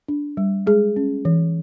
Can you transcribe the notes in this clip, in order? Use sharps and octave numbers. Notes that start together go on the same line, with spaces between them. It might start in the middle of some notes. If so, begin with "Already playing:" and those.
D4
G3
G#3 G#4
C#4
E3